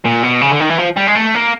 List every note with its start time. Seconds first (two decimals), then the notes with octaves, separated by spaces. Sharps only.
0.05 A#2
0.23 B2
0.41 C#3
0.51 D3
0.60 D#3
0.69 E3
0.78 F3
0.96 G3
1.07 G#3
1.15 A3
1.35 A#3